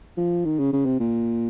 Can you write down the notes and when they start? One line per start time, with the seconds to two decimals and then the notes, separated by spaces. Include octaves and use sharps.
0.17 F3
0.45 D#3
0.59 C#3
0.73 C#3
0.85 C3
1.00 A#2